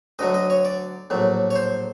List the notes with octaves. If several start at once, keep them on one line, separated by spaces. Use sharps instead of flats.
D2 D3 F#3 D#5
D#5
C#5
D5
A#1 A2 F#3
C#5
C5